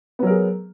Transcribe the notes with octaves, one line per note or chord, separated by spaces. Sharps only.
F#3 B3 G#4 A#4